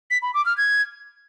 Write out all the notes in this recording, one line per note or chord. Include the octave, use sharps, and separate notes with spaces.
B6
B5
D6
F6
G#6